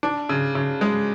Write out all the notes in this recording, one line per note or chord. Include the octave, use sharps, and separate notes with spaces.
D4
C#3
C#3
G#3